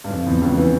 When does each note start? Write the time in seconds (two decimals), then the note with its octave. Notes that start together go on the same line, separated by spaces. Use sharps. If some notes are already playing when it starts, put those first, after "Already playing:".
0.04 G2
0.11 F2
0.26 E2
0.42 C#2 C#3
0.58 E3